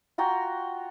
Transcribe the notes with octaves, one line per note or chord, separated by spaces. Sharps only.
F4 F#4 G5 A#5